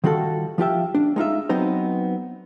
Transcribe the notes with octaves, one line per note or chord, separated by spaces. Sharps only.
D#3 G3 F4 F#4 A4
F3 F4 G4 E5
D4
G#3 D#4 F4 E5
F#3 B3 C4 D#4 C5